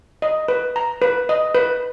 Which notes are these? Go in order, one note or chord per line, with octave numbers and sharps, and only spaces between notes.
D#5
B4
A#5
B4
D#5
B4